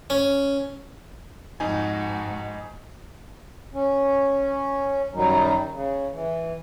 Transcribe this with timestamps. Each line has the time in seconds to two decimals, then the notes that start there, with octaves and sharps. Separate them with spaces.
0.10 C#4
1.60 F2 G#2 D#4 F#4 G#5
3.74 C#4
5.14 F#2 D#3 F#3 G3 D#4
5.73 C#3
6.13 E3